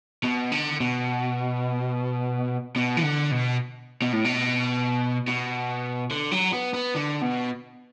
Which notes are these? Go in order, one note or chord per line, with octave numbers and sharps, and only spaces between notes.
B2
D3
B2
B2
E3
D3
B2
B2
A2
B2
B2
D3
F#3
B3
B3
D3
B2